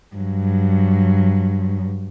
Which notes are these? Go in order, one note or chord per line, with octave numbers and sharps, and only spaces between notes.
G2 F#3